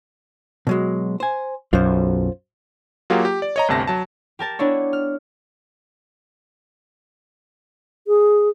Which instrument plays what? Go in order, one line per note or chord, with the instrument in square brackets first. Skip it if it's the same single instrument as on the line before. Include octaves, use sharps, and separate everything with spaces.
[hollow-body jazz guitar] B2 F#3 G#3
C5 G#5
[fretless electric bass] B1 F#2 [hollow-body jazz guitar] F4 C5
[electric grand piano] F#3 A#3 F4 G4 G#4 F#5
G4
D5
C#5 D#5 A#5
G1 D2 C3 A5 A#6
F#3 A5
[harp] G4 A#4 A5
B3 D4 E4 C#5
F6
[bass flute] G#4